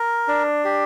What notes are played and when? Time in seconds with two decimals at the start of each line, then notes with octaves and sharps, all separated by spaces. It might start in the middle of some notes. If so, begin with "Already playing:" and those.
Already playing: A#4
0.28 D4
0.65 G4